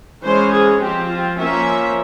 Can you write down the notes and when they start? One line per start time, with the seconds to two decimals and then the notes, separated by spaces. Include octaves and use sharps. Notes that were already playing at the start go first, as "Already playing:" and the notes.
0.23 E3 G#3 C#4 C5
0.52 G#4
0.80 F3 C4 G4
1.08 F4
1.37 F3 A#3 C#4 E5